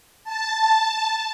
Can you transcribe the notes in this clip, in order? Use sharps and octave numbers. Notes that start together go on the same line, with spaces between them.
A5